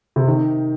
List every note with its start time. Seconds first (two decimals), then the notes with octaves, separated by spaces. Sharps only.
0.16 C3
0.28 D#3